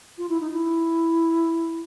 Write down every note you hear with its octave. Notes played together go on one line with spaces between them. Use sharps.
F4
E4
D#4
E4